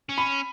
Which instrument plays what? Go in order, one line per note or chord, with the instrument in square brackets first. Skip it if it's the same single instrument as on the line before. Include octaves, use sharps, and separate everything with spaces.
[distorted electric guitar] C#4
[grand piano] B5